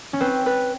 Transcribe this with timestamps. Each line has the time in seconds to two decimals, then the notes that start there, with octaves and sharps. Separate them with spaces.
0.13 C#4
0.20 C4 B4
0.46 B4